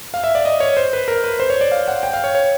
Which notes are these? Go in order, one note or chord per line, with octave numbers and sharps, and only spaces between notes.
F5
E5
D5
D#5
C#5
C5
B4
A#4
B4
C5
C#5
D5
F5
F#5
G5
F5
C#5
C#5